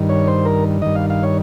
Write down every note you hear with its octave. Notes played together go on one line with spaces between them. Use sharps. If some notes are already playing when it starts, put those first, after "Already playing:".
Already playing: G2 D#3
C#5
C5
A#4
G2 D#3 D#5
F5
F5
C#5